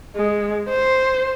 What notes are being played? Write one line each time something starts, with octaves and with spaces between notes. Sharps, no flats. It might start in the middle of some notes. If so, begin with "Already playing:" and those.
G#3
C5